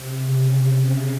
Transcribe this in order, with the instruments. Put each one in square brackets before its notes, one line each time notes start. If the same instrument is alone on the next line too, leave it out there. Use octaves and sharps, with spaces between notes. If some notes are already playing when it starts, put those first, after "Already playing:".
Already playing: [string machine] C3
C#3